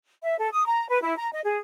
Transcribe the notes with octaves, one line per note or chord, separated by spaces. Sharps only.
E5
A4
D#6
A#5
B4
E4
A#5
D#5
G#4